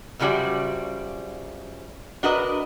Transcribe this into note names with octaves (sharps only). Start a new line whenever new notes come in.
F#2 C#3 F3 G3 F#4 D5
D4 F#4 A#4 B4 D#5